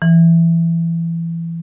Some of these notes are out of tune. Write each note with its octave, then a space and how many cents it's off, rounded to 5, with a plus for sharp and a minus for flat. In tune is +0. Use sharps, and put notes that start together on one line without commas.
E3 +20